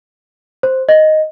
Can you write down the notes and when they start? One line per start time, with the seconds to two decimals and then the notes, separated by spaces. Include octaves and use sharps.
0.63 C5
0.89 D#5